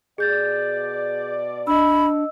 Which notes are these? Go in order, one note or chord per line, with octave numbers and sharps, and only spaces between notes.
B2 G#4 D5 G6 A6
D4 D#5 B5 E6